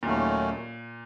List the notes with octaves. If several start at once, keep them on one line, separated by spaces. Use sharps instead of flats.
D#2 A#2 D#3 F#3 A3 C#4